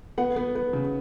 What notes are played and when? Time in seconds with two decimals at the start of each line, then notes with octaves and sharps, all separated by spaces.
0.18 B3 F#5
0.36 B3
0.55 B3
0.73 C#3